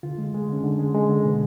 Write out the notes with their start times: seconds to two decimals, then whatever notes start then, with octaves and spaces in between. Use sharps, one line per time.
0.03 D3 F4
0.18 G#3
0.34 G#3
0.49 D3 C#4
0.64 D3 D4
0.79 G#3
0.94 G#3
1.09 D3
1.25 B2